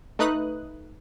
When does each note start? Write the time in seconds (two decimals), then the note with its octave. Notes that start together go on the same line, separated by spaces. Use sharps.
0.19 A3 D#4 B4 D#6 F#6